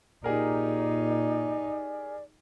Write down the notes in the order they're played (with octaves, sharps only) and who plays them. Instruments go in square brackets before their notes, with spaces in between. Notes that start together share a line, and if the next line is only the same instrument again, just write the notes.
[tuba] A#2 [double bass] D#4 [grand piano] G4 G#4 A#4 [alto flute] D5